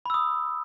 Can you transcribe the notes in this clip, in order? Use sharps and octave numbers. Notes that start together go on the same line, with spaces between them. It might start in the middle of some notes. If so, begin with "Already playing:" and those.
B5 D#6 E6